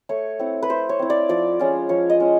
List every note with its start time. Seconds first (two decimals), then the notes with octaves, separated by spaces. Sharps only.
0.09 A3 C#5
0.39 C4 E4
0.63 B4
0.70 A3 C5
0.89 C#5
0.99 C4 E4
1.10 D5
1.29 F3 D5
1.59 G#3 C#4 F4
1.89 F3 C#5
2.10 D#5
2.20 G#3 C#4 F4